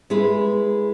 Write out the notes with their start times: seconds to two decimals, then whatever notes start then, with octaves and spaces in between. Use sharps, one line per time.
0.10 G#3 E4 G#4 B4